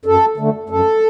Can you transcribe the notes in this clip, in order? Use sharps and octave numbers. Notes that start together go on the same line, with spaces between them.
F#2 A4
D3 A3
F#2 A4